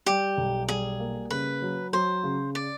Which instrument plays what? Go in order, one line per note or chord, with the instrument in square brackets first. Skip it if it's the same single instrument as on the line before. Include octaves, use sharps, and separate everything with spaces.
[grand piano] G3 [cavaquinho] G4
[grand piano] B1
[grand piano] G3 [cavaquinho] G#4
[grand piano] A#3
[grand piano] C#3 [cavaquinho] B4
[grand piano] F#3
[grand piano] F#3 [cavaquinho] C5
[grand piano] C#3
[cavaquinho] D5